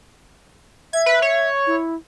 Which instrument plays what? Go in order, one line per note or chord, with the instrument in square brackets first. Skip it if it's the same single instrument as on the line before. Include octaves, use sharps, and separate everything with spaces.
[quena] E5 [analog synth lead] G#6
[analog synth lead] B4
C#5
[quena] E4